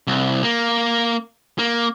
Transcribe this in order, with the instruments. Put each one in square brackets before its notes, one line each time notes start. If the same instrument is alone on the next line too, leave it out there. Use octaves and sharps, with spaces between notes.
[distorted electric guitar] C2
A#3
A#3